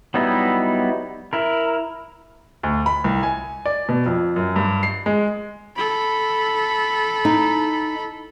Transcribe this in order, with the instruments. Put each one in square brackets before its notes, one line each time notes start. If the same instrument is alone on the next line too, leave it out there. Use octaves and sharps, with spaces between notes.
[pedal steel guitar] F#3 G3 B3 D#4 E4
E4 A#4
[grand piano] D2
B5
C2
G#5
D5
B2
F2
F#2
G2
C7
G#3
[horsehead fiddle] A4 B5
[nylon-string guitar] D#4